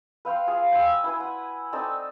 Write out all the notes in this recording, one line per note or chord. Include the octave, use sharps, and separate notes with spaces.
B4 F5 G5 C6
F4 G#4 F5
G5 G#5 C6 E6
E4 B4 G#5
F#5
C4 D#4 A4 D5